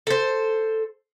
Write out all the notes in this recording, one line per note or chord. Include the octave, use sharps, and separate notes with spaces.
A4 C5